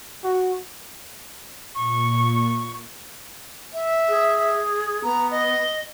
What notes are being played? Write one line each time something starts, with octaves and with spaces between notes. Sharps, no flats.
F#4
A#2 C#6
E5
G#4
B3 A#5
D#5